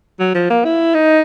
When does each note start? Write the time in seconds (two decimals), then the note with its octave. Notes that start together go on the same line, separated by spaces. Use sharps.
0.20 F#3
0.35 F3
0.50 A#3
0.64 E4
0.94 D#4